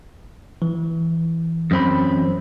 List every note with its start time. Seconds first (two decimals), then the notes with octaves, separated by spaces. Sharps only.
0.62 E3
1.71 F#2 C4 B5